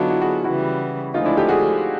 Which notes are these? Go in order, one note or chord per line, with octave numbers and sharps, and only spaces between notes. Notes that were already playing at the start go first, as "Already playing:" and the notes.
Already playing: D3 F#3 B3 D4 D#4 F4
E4 F#4
F#4 G#4
C#3 E3 G3 E4 F#4
D2 D3 F3 G#3 D#4 F4
D4 E4
G4 A4
F#4 G#4